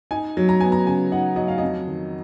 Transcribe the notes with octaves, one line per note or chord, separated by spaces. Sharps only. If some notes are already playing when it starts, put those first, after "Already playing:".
D#4 G#5
F#3
A#5
B3 G#5
A#5
C#3 G#5
D#4 F#5
F#3 D#5
F5
F2 D#5
D#3